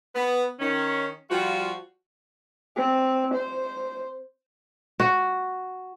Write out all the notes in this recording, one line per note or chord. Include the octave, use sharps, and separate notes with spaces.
B3
D#3 C#4
F3 G3 F4 F#4
C4
C5
F#4